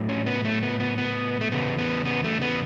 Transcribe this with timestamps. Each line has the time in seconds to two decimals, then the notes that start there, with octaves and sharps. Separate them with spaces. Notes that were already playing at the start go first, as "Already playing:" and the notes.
Already playing: A2 F#3 A3
0.09 C#4
0.26 B3
0.45 A3
0.63 B3
0.80 B3
0.98 B3
1.41 A3
1.52 E2 C#3 B3
1.79 B3
2.05 B3
2.24 A3
2.41 B3